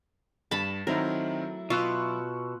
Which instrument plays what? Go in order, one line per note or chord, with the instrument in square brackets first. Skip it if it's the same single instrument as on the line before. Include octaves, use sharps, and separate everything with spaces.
[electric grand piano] G2 [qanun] A5 B5
[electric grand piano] D#3 C4 D#4 [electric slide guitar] F#3 A3 E4 [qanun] A#4
[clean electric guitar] B2 [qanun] F4 [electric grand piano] C#6 E6 F#6